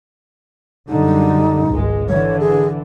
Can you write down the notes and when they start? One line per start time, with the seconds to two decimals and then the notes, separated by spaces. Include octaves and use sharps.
0.89 F#2 D3 G3 D#4
1.69 G#1 C#2 G#3
2.09 D3 E3 C#5
2.40 G#4